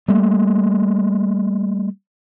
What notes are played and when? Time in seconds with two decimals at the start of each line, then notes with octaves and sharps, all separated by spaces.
0.08 G3 A3 A#3